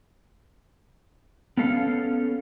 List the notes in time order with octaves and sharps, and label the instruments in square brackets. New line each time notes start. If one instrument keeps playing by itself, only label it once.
[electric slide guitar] B3 C#4 A4 F5